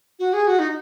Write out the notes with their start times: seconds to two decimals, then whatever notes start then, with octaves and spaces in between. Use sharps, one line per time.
0.19 F#4
0.33 G#4
0.48 F#4
0.59 D#4